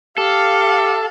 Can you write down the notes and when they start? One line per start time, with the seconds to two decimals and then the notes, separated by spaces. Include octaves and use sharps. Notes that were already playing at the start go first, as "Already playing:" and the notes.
0.18 G4 A4 F5